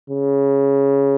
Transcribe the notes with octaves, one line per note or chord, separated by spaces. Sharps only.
C#3